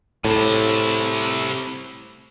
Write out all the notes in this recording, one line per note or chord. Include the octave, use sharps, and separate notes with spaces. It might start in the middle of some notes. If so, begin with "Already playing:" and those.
A2 C3 E4